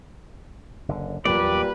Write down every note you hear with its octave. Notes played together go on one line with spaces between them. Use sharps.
F#1 D3
E2 A#2 F#3 G3 A#3 B4 D5